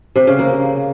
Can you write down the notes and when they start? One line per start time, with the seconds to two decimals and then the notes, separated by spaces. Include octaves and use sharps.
0.16 C3
0.27 C#3
0.39 A#3